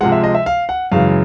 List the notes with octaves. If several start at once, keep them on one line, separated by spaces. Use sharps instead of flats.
C3 F3 G#3 F#5
E5
D#5
E5
F5
F#5
F#2 C#3 E3 G#3 F5